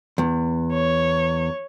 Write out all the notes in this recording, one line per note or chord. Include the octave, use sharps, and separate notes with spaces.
E2
C#5